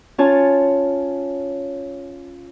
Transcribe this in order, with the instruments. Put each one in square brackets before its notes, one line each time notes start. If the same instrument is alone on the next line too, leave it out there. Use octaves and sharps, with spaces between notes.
[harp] C#4 F4 C#5 A5